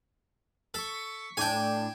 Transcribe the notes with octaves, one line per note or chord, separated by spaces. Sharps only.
A4 C#6 B6
A2 D4 G5 G#5 E7